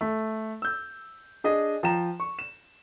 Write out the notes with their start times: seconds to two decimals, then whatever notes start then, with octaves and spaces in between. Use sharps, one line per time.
0.01 A3
0.62 E6 G6
1.44 D4 G#4 D#5
1.83 F3 G5 A#5 E7
2.20 C#6
2.39 E7